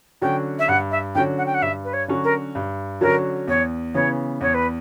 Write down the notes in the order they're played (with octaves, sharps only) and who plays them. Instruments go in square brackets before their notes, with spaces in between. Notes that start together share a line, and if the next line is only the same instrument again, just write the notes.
[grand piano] D3 F#3 C#4 F#4 [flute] G5
[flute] E5
[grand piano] G2 [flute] F#5
[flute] E5
[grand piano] D3 F#3 C#4 F#4 [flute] G5
[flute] F#5
G5
F#5
[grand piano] G2 [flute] E5
[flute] B4
C#5
[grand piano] D3 F#3 C#4 F#4
[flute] A#4
[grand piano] G2
[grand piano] D3 F#3 C#4 F#4 [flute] A#4
[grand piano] E2 [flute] C#5
[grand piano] C#3 E3 B3 [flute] C#5
[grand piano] E2 [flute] C#5
[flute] B4